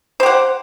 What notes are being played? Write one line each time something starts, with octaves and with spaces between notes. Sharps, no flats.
G4 C5 F#5